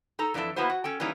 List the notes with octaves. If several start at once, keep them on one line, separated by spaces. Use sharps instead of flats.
D#4 A4 A#5
F2 E3 D4 E4 A4 E5
A#3 B3 E4 F#4 B4 C5
F#4
C#4 A4 G5
E3 G3 A#3 C#4 D#4